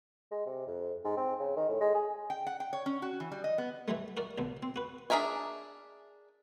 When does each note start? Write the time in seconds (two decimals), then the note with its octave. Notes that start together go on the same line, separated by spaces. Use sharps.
0.31 G#3
0.46 C3
0.67 F2
1.04 G#2
1.17 C4
1.39 C#3
1.56 D#3
1.69 A2
1.80 G#3
1.94 G#4
2.30 G5
2.47 F#5
2.60 G5
2.73 C#5
2.86 C#4
3.02 F#4
3.20 E3
3.32 G3
3.44 D#5
3.58 B3
3.88 E3 F#3 G3 A3
4.17 F#4 A#4 D5
4.38 A1 D2 B2
4.63 C4
4.76 F#4 B4
5.10 D4 G#4 A#4 E5 G#5